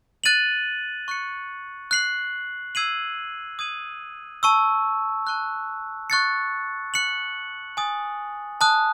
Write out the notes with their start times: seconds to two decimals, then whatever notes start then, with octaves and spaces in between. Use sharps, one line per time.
0.24 F#6 A6 D#7 F#7
1.08 C#6 F#6 C#7
1.91 F#6 C7 F#7
2.75 E6 G#6 C7 D#7 F#7
3.59 D#6 G#6 D#7 F#7
4.43 A5 C#6 E6
5.27 A5 C#6 F#6
6.10 C#6 F#6 A6 C#7
6.94 F#6 C#7 F#7
7.77 G#5 D#6 A6
8.61 A5 D#6 F#6